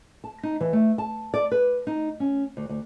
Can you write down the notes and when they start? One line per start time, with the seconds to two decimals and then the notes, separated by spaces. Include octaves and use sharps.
0.24 A5
0.43 D#4
0.61 E3
0.73 A3
0.98 A5
1.34 D5
1.51 B4
1.87 D#4
2.20 C#4
2.57 D2
2.69 D2